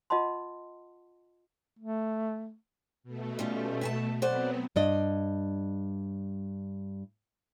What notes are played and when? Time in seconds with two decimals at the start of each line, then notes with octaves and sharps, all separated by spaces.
0.10 F4 D#5 F#5 A5 C6
1.79 A3
3.03 B2 A3
3.39 G3 C#4 F4
3.81 E5 G#5 A5
4.22 F#3 B3 C4 C5 D5 F#5
4.76 G2 D4 D#5